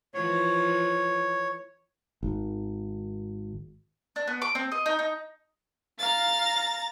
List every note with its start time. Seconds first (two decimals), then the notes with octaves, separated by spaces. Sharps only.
0.14 E3 F3 C#5
2.23 G#1
4.16 D4
4.27 B3
4.42 D6
4.55 C4
4.72 D#5
4.86 D#4
4.99 D#4
5.99 F5 A#5 A6